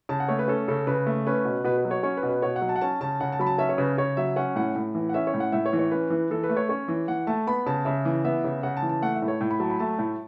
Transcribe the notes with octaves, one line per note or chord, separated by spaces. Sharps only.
C#3 A5
F#5
A3 C#5
B4
C#4 A4
C#3 A4
C#3 B4
A3
C#4 B4
B2
B2 B4
B4
F#3
C#5
C#4 C#5
B4
B2
B4
B2 C#5
F#5
F#3
A5
F#5
C#4 A5
C#3 A5
C#3 F#5
A5
F#3 B5
A5
C#4 E5
C#5
C#3 B4
C#3 C#5
F#3 E5
C#4 F#5
A2 F#5
A2
E3
F#5
C#4 E5
C#5
A2
F#5
A2 E5
C#5
E3
C#5
C#4 B4
E3
E3 A4
B4
A3
C#5
C#4 C#5
E3
E3 F#5
A3 A5
B3 B5
C#3 A5
C#3 E5
E3
B3 E5
C#3
C#3 F#5
A5
E3
A5
A3 F#5
E5
A2
C#5
A2
B5
F#3 A5
B5
A3 A5
A2